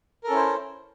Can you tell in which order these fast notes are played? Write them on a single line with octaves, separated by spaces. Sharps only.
A#4 A4 C#4 E4 C5